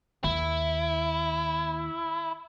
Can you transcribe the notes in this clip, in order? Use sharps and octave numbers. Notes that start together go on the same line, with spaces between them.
D#2 E4